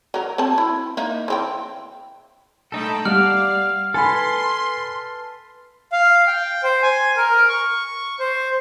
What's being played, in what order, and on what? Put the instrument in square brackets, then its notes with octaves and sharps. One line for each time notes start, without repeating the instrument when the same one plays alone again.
[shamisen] F#3 A#4
C4 A5
E4
A#3 D#4 E5
E3 C4 G5
[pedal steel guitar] A3 D#4 A4 [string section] G5 A5 B5
[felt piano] G3 [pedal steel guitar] D5 F#5 [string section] F5 [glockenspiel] F6
[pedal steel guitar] A4 B4 [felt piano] G#5 B5 [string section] C6
[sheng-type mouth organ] F5
G5
C5
G#5
A#4
C#6
C5